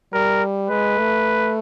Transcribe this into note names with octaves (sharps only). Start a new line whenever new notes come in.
G3 A#4
G#3 B4
A3